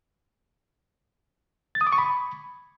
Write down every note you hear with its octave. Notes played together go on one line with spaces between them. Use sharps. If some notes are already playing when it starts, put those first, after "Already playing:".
A6
D#6
D6
C#6
B5